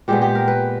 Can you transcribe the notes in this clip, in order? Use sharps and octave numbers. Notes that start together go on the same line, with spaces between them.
A#2 G#3 B3 G4
G4
A#4
B4